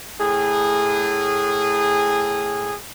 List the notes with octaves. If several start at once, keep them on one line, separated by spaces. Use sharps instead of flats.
A2 G#4